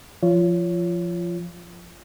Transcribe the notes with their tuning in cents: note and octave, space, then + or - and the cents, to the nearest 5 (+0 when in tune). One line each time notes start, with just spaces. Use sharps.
F3 -10 F4 -20 C#5 +15